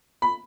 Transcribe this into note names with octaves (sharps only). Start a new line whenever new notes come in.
B5